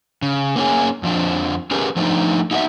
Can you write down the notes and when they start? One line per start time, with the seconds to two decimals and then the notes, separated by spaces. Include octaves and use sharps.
0.22 C#3
0.56 A#3 C#4 G4 G#4
1.03 F2 F3 D4
1.71 C#4 G4 G#4 A#4 B4
1.96 F3 A3 D4 D#4
2.51 D#4 E4 F#4 A4 D5 E5